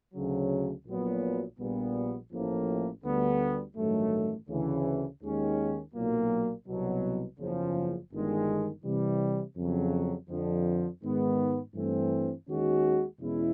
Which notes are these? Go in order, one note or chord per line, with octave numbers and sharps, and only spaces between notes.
D2 C#3 F#3
A#1 A#2 F#3 B3
A#1 A#2 G3 B3
A1 A2 F3 A#3
D2 D3 G3 B3
A1 G2 D#3 F#3 A3
D2 C#3 E3
D#2 D#3 G#3 C#4
B1 A#2 F#3 A#3
C2 B2 F#3
F#1 E2 C#3 F3
G1 G2 D#3 G#3
C3 E3 G3
F2 C#3 F#3
F2 D3 F3
G#2 D#3 G#3 B3
G2 E3 A3 C4
D#2 D#3 G#3 C#4 F#4
E2 B2 G#3 C#4 E4